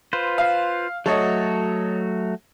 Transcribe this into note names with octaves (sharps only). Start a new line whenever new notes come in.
F4 B4 C5
F5
F#3 A3 F#4 A4 C#5 D#5